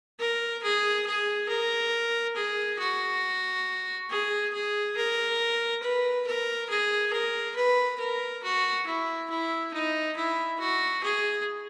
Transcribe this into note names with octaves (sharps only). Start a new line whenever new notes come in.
A#4
G#4
G#4
A#4
G#4
F#4
G#4
G#4
A#4
B4
A#4
G#4
A#4
B4
A#4
F#4
E4
E4
D#4
E4
F#4
G#4